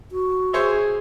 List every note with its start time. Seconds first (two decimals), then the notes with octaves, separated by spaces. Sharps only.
0.12 F#4
0.53 G#4 C5 C#5 E5